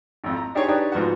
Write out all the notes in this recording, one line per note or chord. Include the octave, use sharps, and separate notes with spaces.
G#1 F2
A#5
D4 D#4 G4 G#4 C5 C#5
D4 D#4 G4 B4 C#5 D5
G#2 F3 B3 F#4 F#5